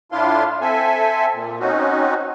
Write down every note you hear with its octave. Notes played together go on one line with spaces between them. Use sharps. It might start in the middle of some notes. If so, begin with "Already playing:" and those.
A2 D4 E4 F4 F5 C6
C4 A4 E5 G#5
A#2
C4 C#4 D#4 F#4